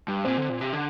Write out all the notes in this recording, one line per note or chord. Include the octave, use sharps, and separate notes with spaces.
G2
A#2 C4
D3
A#2
C3
D3